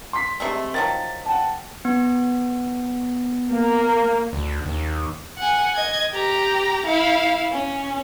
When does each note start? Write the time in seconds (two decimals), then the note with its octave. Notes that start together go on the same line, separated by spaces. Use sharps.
0.13 C6 B6
0.40 C3 G#3 A3
0.74 D#3 F3 F#3 A6
1.26 F#5 G5 A5
1.85 B3
3.52 A#3
4.33 D2
4.66 D#2
5.37 F#5 G#5
5.76 D#5 G#6
6.12 G4 A#5
6.86 E4 F5
7.52 C#4